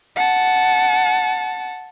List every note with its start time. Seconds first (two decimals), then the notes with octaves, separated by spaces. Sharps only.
0.16 F#5 A5